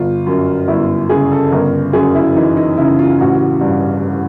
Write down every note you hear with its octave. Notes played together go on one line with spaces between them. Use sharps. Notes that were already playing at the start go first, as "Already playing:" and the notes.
Already playing: G1 F4
F#2
G1 E4
C#3 G#4
A4
G1 A#4
F#2 G#4
E4
E3 D#4
D#4
C#3 E4
F4
A1 F#4
G2